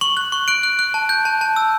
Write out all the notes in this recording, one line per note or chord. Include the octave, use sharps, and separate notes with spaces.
C#6 F#7
F#6
C#6
F#6 D7
F#6
F#6
A5
G6
A5
A5
E6